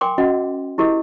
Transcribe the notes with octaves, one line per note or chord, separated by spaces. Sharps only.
A#4 G5 G#5 C6 D6
C#4 F#4 D#5 F#5
E4 G4 G#4 A#4 D#5